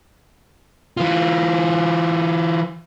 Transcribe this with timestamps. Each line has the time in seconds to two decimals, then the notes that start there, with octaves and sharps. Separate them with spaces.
0.97 E3 F4